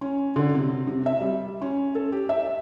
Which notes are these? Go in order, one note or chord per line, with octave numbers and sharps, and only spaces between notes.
C#4
D3
C3
C3
E5
G3
C#4
A4
G4
E5